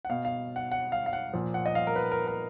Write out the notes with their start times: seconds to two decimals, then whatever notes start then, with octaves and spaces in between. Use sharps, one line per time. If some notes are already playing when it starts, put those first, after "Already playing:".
0.05 F#5
0.09 B2 F5
0.25 F5
0.56 F#5
0.72 F#5
0.92 F5
1.06 F5
1.13 F#5
1.33 A#2 F3
1.54 F#5
1.66 D#5
1.75 F5
1.87 A#4
1.96 B4
2.12 A#4
2.28 A#4